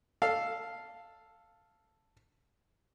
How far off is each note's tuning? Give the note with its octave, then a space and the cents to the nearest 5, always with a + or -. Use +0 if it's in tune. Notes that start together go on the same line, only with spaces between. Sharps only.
A4 +0 F5 -5